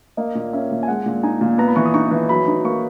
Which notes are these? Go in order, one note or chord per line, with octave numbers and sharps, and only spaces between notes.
A#3 D#5
A#2
C#4 E5
A#2
G#5
G#3 F#5
A#2
D#4 G#5
A#2
B3 A#5
B5
E3 C#6
D#6
D#4 C#6
E3
F#3 B5
D#4
A#3 C#6